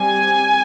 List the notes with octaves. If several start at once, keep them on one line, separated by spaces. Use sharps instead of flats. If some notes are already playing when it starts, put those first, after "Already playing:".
Already playing: G3 C4 G#5